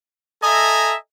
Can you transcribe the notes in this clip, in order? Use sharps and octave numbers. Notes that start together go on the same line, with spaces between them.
A4 D#5 E5 G#5 A#5